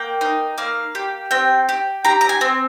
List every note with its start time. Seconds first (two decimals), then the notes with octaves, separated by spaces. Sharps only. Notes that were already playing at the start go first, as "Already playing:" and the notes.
Already playing: A#3 G5
0.21 D#4
0.58 A#3 F5
0.95 G4
1.31 C4 G5
1.69 G4
2.05 G4 A#5
2.21 A#5
2.29 G#5
2.41 C4